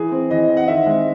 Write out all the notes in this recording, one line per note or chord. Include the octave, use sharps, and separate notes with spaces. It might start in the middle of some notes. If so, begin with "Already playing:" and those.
Already playing: E3 G#4
C4
E3 D#5
C4
F#5
D#3 E5
G#3 C4